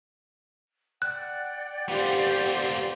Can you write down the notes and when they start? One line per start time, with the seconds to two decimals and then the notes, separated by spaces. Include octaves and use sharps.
1.02 D5 F#5 G5 F#6
1.89 B3 F4 G4 C5